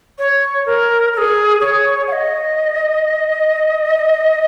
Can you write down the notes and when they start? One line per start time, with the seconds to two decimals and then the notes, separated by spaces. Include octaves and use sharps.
0.18 C#5
0.65 A#4
1.13 A#4
1.17 G#4
1.60 C#5
2.07 F#5
2.12 D#5